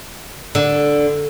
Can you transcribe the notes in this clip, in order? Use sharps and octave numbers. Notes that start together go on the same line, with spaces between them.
D3